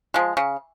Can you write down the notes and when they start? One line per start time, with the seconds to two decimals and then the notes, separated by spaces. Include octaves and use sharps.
0.14 F3 G#3
0.37 C#3